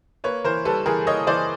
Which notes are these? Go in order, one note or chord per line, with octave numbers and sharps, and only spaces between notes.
A#3 B4 C#5
E3 A#4 C5
G3 A4 B4
E3 G#4 A#4
A#3 C#5 D#5
E3 C5 D5